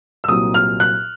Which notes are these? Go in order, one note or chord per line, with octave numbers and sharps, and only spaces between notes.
E6
C2 A#2 F#3 D#6
F6
F#6